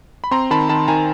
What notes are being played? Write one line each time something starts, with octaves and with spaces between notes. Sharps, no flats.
B5
C4 A#5 C6
D#3 A5 B5
D#3 A5 B5
D#3 G#5 A#5